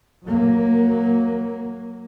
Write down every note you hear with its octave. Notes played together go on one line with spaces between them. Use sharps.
F#3 A#3